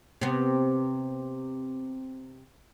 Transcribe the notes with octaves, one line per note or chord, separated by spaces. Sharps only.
C3 B3